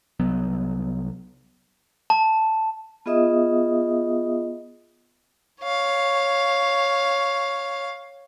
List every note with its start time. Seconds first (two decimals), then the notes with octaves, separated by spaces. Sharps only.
0.20 C2 F#3 B3
2.10 A5
3.06 B3 F4 G#4 D#5 E5 D#6
5.61 C#5 F5